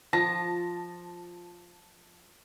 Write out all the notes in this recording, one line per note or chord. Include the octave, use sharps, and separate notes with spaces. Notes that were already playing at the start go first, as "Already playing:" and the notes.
F3 A5 A#6